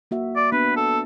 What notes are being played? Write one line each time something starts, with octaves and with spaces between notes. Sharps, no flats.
A#3 F#4 E5
D5
B3 D4 B4
A4